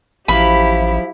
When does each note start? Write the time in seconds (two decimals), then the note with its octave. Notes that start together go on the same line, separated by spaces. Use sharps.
0.28 A1 F3 F#3 E4 G4 B5